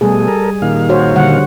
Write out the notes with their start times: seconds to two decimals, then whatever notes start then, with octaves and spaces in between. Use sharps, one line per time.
0.01 B2 G3 A3 G#4
0.28 A4 A#4
0.62 A#2 D#3 F5
0.89 F#4 C5 C#5
1.16 D3 G3 F#5